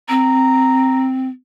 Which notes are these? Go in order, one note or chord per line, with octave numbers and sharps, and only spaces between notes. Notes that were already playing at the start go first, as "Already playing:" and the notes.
C4 A#5